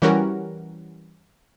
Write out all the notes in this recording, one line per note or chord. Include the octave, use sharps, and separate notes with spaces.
E3 G3 C#4 F#4 A#4